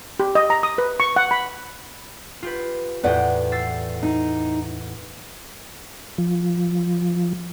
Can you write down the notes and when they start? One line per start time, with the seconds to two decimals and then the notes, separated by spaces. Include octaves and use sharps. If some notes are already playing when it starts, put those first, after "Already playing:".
0.20 G4
0.35 D#5
0.50 A#5
0.63 D#6
0.78 B4
1.00 C#6
1.16 F#5
1.31 B5
2.43 F4 G4 B4
3.03 E2 A2 B4 D5 F#5 G5
3.52 E6 A6 C7
4.03 D#4
6.18 F3